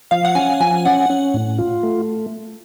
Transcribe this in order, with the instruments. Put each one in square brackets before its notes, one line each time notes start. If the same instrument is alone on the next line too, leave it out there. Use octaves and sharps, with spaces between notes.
[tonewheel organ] F3 [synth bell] F5
[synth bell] F#5
[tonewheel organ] C#4 [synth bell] G#5
[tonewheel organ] F3 [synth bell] G#5
[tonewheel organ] C#4 [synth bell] F#5
[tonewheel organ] C#4
A2
F4
A3